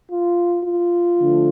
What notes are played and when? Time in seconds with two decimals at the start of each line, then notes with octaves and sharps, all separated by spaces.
0.11 F4
0.64 F4
1.17 D3 F3 A3